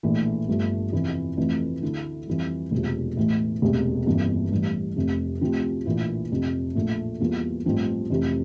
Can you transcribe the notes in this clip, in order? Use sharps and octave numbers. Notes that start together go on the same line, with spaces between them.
A#1 A2 E3 A3
G1 G2 F3 A3
F2 C3 E3
F1 F2 E3 A3
D2 D3 A3 E4
F2 E3 G3
E1 D2 C3 F3
A1 A2 E3
E1 D2 C3
G1 F2 E3 G3 A#3
A1 G2 E3
F1 F2 C3
D2 C3 F3 C4 G4
A#1 A2 E3 A#3 F4
F1 F2 C3
A#1 A2 F3 A3
E2 E3 G3 A#3 F4
A1 G2 F3 C4
F1 F2 C3 E3